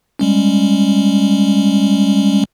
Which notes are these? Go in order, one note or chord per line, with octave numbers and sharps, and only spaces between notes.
G3 G#3 C#4